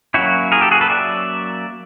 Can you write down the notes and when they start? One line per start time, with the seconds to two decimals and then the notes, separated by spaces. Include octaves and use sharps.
0.14 F#3 A#3 C#4 E4 F#4
0.52 G#4 A#4
0.61 G4 A4
0.71 F#4 G#4
0.81 A4 B4
0.90 D5 E5